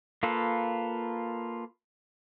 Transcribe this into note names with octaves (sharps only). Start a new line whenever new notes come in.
A#3 F4 A4 B4